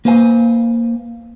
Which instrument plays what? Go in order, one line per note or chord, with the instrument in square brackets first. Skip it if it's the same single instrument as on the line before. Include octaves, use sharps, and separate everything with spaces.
[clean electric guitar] A#3 B4 C5 F5 G#5